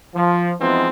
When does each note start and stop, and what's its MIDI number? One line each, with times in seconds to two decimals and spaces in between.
0.15 0.54 53
0.60 0.89 52
0.60 0.89 53
0.60 0.89 56
0.60 0.89 59
0.60 0.89 60
0.60 0.89 63